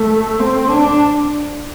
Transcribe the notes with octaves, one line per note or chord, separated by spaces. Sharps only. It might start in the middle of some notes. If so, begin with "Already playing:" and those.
Already playing: A3
C4
D4